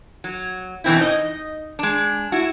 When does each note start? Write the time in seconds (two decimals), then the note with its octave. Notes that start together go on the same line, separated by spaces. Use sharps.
0.24 F#3
0.84 B2 E3 C4 E4
0.99 D#4 D#5
1.79 G#3 D4
2.32 E4 F#4